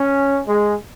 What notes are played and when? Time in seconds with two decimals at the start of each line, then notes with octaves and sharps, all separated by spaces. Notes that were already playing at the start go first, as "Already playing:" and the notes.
Already playing: C#4
0.47 G#3